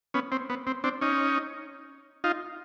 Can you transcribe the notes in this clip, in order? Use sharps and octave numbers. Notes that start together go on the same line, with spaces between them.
B3 C#4
C4
B3
C4
C4 D4
C#4 D#4
D#4 F4